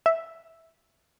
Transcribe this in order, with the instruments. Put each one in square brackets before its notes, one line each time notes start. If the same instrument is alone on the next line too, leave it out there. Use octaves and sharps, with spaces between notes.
[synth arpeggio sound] E5